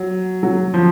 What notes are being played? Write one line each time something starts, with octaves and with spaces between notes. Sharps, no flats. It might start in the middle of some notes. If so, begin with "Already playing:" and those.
Already playing: F#3
F#3
F3